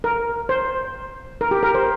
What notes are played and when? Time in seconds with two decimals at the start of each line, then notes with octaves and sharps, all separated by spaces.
0.04 A#4
0.49 C5
1.41 A#4
1.51 G4
1.63 A#4
1.75 C5